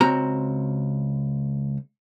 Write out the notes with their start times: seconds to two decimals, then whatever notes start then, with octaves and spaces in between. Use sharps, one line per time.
0.01 C#2 C4 F#4 A#5